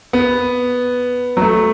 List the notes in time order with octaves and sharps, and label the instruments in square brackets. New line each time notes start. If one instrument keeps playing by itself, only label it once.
[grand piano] B3
F#3
A3